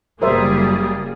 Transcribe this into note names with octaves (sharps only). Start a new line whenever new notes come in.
F#1 G3 A#3 G#4 A#4 C5 E5